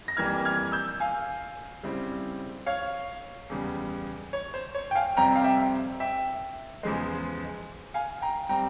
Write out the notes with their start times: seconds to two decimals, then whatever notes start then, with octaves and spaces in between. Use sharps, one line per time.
0.08 A#6
0.17 F2 E3 G3 A#3 F6 G#6
0.45 F6 G#6
0.72 E6 G6
1.00 F5 G#5
1.83 C#3 G3 C4 E4
2.66 C#5 F5
3.50 E2 C#3 G3
4.33 C#5
4.54 C5
4.75 C#5
4.91 G5
4.95 F5 G#5
5.17 F2 C3 G3 C4 G5 A#5
5.36 F5
5.44 E5 G5
6.00 E5 G5
6.83 E2 C#3 F3 G#3
7.94 F5 G#5
8.21 G5 A#5
8.49 G3 C4 G5 A#5